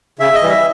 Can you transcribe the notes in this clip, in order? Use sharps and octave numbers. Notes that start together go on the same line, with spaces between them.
C#3 E5
D#5
E3 G3
E5